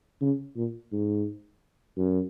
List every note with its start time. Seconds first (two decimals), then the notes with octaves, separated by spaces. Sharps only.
0.21 C#3
0.56 A#2
0.92 G#2
1.98 F#2